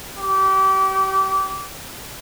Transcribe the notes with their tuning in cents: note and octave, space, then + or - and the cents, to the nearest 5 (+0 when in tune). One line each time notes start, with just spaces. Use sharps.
G4 -30